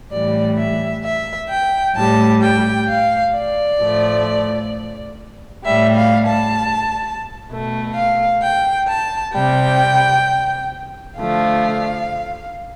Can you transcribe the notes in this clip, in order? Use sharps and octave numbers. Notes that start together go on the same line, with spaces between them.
A2 E3 G3 D5
E5
E5
G5
A2 G3 A5
G5
F5
D5
A2 F3 A3
A2 G3 E5
F5
A5
B2 A3
F5
G5
A5
C3 G3 G5
D3 F3 A3 F5